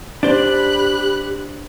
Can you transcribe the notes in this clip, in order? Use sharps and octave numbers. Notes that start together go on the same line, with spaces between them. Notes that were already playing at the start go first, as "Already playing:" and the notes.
D4 G4 C5 B5 F#6